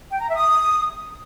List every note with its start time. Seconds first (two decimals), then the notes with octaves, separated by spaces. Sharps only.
0.11 G5
0.20 A#5
0.28 E5
0.37 D#6